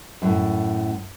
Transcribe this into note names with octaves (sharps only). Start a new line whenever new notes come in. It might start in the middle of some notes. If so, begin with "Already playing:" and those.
F#2 A2